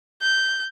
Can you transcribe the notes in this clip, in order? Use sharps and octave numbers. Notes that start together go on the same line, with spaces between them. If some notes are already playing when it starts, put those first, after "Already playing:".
G6